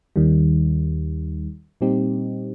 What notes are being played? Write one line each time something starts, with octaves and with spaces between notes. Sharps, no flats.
D#2 D#3 G3
A#2 G3 C4 D#4 G4